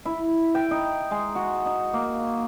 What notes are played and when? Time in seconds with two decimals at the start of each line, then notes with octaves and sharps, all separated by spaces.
0.05 E4
0.55 G5
0.71 D#4
1.11 G#3
1.35 F#4
1.66 D#4
1.93 A#3